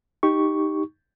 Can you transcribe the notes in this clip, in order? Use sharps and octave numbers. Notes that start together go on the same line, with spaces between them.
D#4 G4 C#6